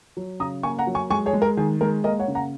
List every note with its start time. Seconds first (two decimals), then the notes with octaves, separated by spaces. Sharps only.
0.17 F#3
0.40 C#3 A#5 D#6
0.63 A#3 G#5 C#6
0.79 F#5 A#5
0.87 F#3
0.95 G#5 C#6
1.10 G#3 G#5 C#6
1.26 G#4 C#5
1.33 G#3
1.42 A#4
1.57 D#3 G#4
1.81 G#3 A#4
2.04 A#3 A#4 D#5
2.19 C#5 F#5
2.28 C#3
2.35 F#5 A#5